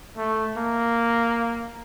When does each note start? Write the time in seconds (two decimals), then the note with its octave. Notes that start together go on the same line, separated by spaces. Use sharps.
0.17 A3
0.57 A#3